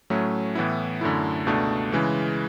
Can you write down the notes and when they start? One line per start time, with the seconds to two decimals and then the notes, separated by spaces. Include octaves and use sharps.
0.10 A2 F#3 A3 C#4
0.55 A2 E3 B3 E4
1.01 F#2 D3 A3 E4
1.47 C#2 B2 A3 D4
1.92 C#3 E3 G#3